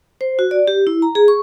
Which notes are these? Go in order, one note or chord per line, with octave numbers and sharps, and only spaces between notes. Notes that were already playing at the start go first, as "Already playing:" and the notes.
C5
F#4
D5
G4
E4
A#5
G#4
C#6